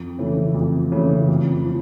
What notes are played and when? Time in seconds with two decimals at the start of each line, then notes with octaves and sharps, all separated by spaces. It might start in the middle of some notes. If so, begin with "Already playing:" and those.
Already playing: F2
0.18 C#3 E3 A3
0.55 F2
0.92 C#3 E3 A3
1.28 F2
1.65 F3